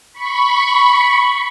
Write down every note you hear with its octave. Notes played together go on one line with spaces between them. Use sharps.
B5 C#6